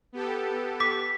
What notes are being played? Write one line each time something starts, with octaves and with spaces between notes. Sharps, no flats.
B3 G4 A4
D6 B6